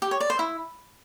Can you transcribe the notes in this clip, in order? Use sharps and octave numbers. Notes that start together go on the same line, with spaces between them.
G4
C#5
D5
C5
E4